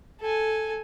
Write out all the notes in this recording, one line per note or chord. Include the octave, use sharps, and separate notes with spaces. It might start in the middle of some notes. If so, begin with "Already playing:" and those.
A4 G#5